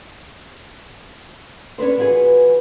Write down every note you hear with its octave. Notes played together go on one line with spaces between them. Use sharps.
C#4 D4 B4 C5
E3 F4 F#4 G#4 B4